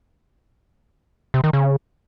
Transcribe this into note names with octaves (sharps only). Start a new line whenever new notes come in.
C3
D#3
C#3